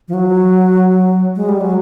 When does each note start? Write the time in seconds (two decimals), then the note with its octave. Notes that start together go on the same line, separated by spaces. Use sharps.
0.08 F3
0.14 F#3
1.36 G#3
1.49 G3
1.61 F#3